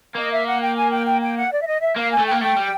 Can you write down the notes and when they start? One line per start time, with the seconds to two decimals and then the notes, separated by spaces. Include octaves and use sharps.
0.15 A#3 D#5
0.31 E5
0.46 F#5
0.61 G5
0.76 G#5
0.91 G5
1.06 G5
1.21 G5
1.36 F#5
1.51 D5
1.61 E5
1.67 D#5
1.81 E5
1.96 A#3 F5
2.11 G#5
2.18 A3
2.26 A#3 G5
2.41 A3 G5
2.56 G3